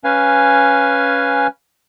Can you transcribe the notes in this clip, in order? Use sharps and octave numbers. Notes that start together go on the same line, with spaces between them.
C#4 B4 F5 G#5